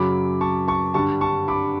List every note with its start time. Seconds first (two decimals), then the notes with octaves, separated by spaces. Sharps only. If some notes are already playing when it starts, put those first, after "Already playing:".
Already playing: F#2 C#3 F#3 B5 D6
0.41 A5 C#6
0.68 A5 C#6
0.94 G2 D3 G3 A5 C#6
1.21 A5 C#6
1.48 B5 D6